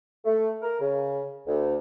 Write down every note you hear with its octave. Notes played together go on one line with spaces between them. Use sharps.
A3
A#4
C#3
D2